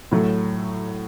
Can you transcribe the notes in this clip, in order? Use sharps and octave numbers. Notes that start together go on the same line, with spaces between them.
A2 F#3 A3